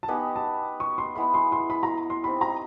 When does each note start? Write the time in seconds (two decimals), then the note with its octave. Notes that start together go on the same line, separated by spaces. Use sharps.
0.03 A5
0.08 B3 D#4 G4 B4 G#5
0.36 A5
0.80 C#6
0.98 C6
1.15 G#3 B3 E4 G#4 B5
1.34 C6
1.52 C6
1.70 B5
1.83 A#5
2.10 C6
2.24 C4 D#4 G4 B5
2.41 A#5